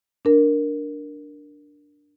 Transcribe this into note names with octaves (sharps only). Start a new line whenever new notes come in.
D4 A#4